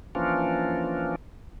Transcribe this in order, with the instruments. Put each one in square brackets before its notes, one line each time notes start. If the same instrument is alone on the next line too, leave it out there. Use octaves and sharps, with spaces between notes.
[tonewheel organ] E3 F3 A#3 C#4 D4 F4